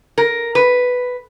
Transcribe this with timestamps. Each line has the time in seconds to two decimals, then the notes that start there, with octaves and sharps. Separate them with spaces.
0.18 A#4
0.55 B4